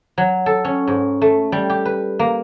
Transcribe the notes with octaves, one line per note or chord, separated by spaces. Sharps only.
F#3
A4
C#4
G#2
A3
G3
G4
B4
A#3